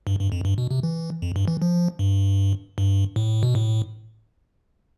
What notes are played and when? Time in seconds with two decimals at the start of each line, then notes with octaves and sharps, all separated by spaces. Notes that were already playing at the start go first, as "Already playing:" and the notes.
0.07 G2
0.19 G2
0.32 F2
0.45 G2
0.58 B2
0.71 C3
0.83 E3
1.22 F2
1.36 G2
1.48 E3
1.62 F3
1.99 G2
2.78 G2
3.16 A2
3.43 B2
3.55 A2